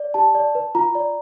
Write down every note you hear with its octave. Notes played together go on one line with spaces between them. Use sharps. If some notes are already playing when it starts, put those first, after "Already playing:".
Already playing: D5
G4 A5
D5
B4
F4 A#5
D5